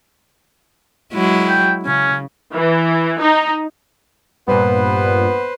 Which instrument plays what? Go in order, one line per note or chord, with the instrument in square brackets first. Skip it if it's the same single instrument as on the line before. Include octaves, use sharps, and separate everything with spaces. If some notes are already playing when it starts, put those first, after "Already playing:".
[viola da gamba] F#3 G#3 E4
[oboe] G5
[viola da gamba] C#3 [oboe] C#4
[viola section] E3
D#4
[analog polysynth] G2 A#2 [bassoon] B3 [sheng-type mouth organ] B4 C5